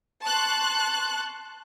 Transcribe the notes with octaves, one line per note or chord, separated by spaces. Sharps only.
A5 C6 C#6 F#6